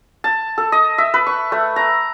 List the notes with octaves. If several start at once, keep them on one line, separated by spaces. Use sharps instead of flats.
A5
A4
D#5
E5
B4
C#6
A3
A#5